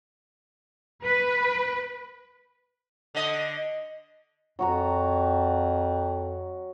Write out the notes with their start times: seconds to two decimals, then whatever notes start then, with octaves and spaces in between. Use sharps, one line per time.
1.04 B4
3.15 D3 D#5
4.59 F2 F#3 F#4 A#5